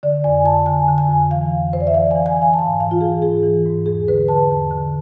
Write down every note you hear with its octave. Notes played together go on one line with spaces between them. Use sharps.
D3 D5
F2 G#5
F2 A5
D3 G#5
D3
G#5
F2
E3 F5
F2
F2 C5
D5
E5
E3 F5
G#5
E3
G#5
E3
F5
A5
G#2 G#5
E3 F5
F4
E3 G#4
G#2 G#4
E3
G#2
E2 G#4
D3 B4
D3 A5
E2
D3